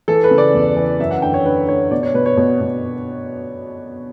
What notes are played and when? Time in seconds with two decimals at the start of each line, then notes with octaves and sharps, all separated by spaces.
0.08 E3 A4
0.24 B4
0.31 C#3
0.38 D5
0.54 E2
0.76 E3
0.99 F#2 E5
1.11 F#5
1.22 D3 G5
1.34 C#5
1.45 D3 B4
1.68 D3 C#5
1.91 B2 D5
2.03 C#5
2.14 B2 B4
2.26 C#5
2.37 B2
2.61 B2